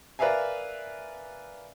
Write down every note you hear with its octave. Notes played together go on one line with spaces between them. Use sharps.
A#4 B4 D5 E5 F5 G#5